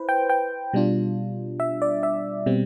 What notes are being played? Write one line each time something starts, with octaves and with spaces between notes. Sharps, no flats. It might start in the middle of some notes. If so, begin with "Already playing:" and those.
Already playing: E4 B4 C5
G5
G5
B2 G3 D4 F4
E5
D5
E5
B2 G3 C4